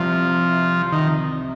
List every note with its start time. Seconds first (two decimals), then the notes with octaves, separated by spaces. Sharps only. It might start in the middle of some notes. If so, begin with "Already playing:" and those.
Already playing: C2 C3 F3
0.92 D#3